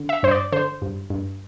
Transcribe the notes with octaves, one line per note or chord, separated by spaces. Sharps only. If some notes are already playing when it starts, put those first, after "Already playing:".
Already playing: D3
E5
G2 C5
D5
D3 C5
G2
G2